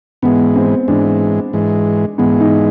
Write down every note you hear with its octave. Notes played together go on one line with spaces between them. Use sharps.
G#2 E3 G#3 B3
C4
G#2 E3 G#3 D4
G#2 E3 G#3
G#2 E3 G#3 B3
D#4